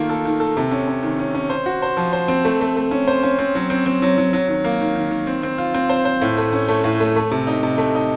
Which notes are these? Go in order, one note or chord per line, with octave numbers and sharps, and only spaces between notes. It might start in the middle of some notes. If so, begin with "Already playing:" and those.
Already playing: D#3 A3 A#3 F4
A4
D#3
A4
C3
C#4
C#4
D#3
C#4
C#4
C5
F#4
C5
F3
C5
C4
A3
A3
A3
C#4
C5
C#4
C4
F#3
C4
C4
F#3
F#3
F#3
D#3
A#3
D#3
D#3
D#3
C4
C4
F4
C4
C5
C5
A2
A3
C#4
A3
A2
A3
A3
C3
D#4
C3
A3
D#4